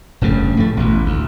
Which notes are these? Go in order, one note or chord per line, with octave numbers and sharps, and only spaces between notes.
F1 G2 C#3 A3
A2 A3
A1 B2
D2